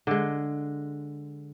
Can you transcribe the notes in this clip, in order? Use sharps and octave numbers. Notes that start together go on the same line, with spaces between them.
D3 G#3